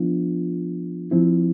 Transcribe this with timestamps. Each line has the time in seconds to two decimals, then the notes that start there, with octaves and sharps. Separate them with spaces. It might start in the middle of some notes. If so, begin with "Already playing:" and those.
Already playing: F3 B3 D4 F4
1.11 F3 C4 E4